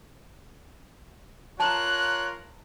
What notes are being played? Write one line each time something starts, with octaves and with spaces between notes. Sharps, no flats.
F4 A#4 C#5 A5 A#5 F#6